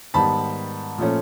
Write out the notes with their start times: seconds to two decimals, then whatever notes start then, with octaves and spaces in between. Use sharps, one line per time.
0.14 G#2 D#3 G3 B3 A5 B5
0.98 A#2 F3 A3 C#4